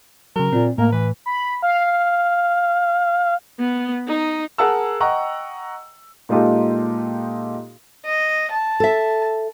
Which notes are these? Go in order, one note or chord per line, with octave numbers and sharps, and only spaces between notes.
C#3 F#3 A#4
A#2 C4
A2 A#3 A#4
E3 B4
B5
F5
B3
D#4
G#4 A#4 F#5 A5 E6
D#5 F#5 G5 A#5 C#6
A#2 G#3 D#4 F4 G4 A4
D#5
A5
A4 E5